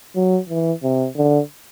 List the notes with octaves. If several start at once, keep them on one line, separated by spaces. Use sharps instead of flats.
F#3
E3
C3
D3